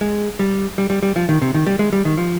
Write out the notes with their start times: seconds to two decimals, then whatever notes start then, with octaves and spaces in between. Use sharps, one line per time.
0.01 G#3
0.39 G3
0.78 G3
0.90 G3
1.03 G3
1.16 F3
1.29 D#3
1.42 C3
1.54 D#3
1.67 G3
1.79 G#3
1.93 G3
2.05 D#3
2.17 F3